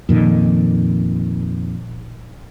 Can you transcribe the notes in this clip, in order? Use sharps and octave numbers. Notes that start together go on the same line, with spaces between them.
F2 A#2 D#3